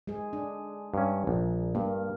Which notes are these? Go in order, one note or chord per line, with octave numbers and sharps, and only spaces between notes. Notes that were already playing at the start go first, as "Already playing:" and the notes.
G#3 G#4
D4
G2 C#4
A#1
G2 A#3